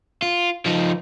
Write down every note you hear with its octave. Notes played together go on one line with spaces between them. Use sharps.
F4
F3 D#4